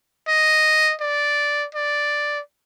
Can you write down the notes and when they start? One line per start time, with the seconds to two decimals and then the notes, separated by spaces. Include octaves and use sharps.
0.28 D#5
1.01 D5
1.74 D5